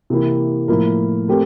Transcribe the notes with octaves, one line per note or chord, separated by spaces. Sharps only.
C3 E3 A#3 E4
A2 F3 A#3 E4 A#4
A3 C4 G4 A#4